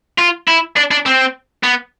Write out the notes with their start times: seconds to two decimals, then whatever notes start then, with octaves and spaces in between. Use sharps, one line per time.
0.19 F4
0.48 E4
0.77 D4
0.91 D4
1.06 C4
1.63 B3